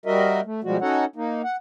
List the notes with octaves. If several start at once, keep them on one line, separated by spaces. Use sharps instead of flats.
G3 F#4 A#4 D#5 E5
A3
B2 F3 G3 G#3 F#4
C#4 D#4 F#4 A4 C#5 F#5
A#3 D#4
F#5